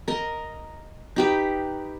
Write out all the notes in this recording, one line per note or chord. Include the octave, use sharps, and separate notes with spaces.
A#4 D#5
D#4 G4 B4